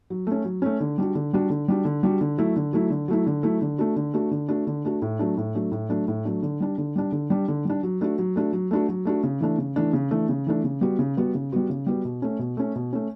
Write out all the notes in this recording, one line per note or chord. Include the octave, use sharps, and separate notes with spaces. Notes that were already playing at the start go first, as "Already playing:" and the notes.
F#3
A3 C#4
F#3
A3 C#4
D3
G3 D4 F#4
D3
G3 D4 F#4
D3
G3 D4 F#4
D3
G3 D4 F#4
D3
F#3 A3 E4
D3
F#3 A3 E4
D3
F#3 A3 E4
D3
F#3 A3 E4
D3
A3 D4 F#4
D3
A3 D4 F#4
D3
A3 D4 F#4
D3
A3 D4 F#4
A2
F#3 A3 D4
A2
F#3 A3 D4
A2
F#3 A3 D4
A2
F#3 A3 D4
D3
G3 D4
D3
G3 D4
D3
G3 D4
D3
G3 D4
F#3
A3 D4 F#4
F#3
A3 D4 F#4
F#3
A3 D4 F#4
F#3
A3 D4 F#4
C#3
E3 A3 D4
C#3
E3 A3 D4
C#3
E3 A3 D4
C#3
E3 A3 D4
C#3
G3 B3 F#4
C#3
G3 B3 F#4
C#3
G3 B3 F#4
C#3
G3 B3 F#4
B2
A3 C#4
B2
A3 C#4
B2
A3 C#4